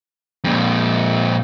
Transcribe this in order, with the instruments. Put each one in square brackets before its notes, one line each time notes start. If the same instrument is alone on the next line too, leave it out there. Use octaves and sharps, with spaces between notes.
[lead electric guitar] F2 A#2